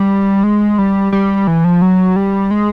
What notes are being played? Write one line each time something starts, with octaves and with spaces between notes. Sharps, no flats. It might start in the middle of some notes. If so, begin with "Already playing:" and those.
Already playing: G3
G#3
G3
G3
E3
F3
F#3
G3
G#3